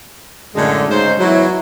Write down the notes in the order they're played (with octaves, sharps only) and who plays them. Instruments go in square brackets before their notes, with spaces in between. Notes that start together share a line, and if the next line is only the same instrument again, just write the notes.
[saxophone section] F#2 A2 G#3 [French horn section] D3
[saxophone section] G#2 C5 [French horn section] C#3 D#4
[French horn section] E2 E4 [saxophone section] F#3